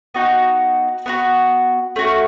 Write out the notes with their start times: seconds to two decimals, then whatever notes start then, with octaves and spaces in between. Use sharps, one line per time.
0.14 B3 D#4 F#4
1.06 B3 D#4 F#4
1.96 A3 C#4 F#4